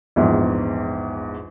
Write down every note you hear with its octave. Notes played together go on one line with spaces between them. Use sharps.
A#1 E2 G#2